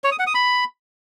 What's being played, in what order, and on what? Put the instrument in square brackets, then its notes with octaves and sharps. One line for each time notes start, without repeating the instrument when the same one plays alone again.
[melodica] C#5
D#6
F#5
D#6
B5